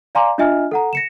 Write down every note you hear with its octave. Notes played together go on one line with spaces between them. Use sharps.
D5 F5 G#5 A#5 C6 D6
D4 F4 D#5 E5 G#5 F6
A4 F#5 A#5
A#6 C#7 E7